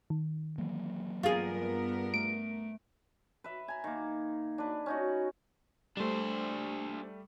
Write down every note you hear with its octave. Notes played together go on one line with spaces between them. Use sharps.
D#3
E3 F#3 A#3
G2 B3 F4 G#4 A#4
A3 D7
B4 E5
G#5 A#5
D#3 A#3
D4 B4
C#4 D#4 F#4
G3 A3 D4 C5